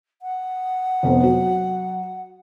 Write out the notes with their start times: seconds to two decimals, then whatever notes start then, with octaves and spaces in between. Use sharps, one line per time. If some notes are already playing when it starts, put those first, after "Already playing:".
0.22 F#5
1.03 F1 F2 B3
1.23 F#3